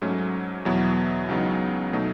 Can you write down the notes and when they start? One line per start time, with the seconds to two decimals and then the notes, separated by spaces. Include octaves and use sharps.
0.02 G#2 F#3 A3 C#4
0.65 E2 B2 F#3 B3 E4
1.28 C#2 C#3 F#3 B3 D#4
1.93 B2 F#3 A3 D#4